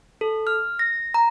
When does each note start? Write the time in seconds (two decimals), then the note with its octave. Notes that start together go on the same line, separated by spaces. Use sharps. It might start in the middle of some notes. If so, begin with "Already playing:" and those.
0.21 A4
0.47 F6
0.79 A#6
1.14 A#5